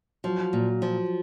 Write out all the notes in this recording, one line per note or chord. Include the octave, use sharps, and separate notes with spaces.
F3 F#3
A#2
F3